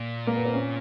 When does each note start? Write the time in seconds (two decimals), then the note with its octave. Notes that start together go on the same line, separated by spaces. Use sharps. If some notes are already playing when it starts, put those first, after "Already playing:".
Already playing: A#2
0.27 A#3
0.36 B3
0.45 C4
0.53 C#4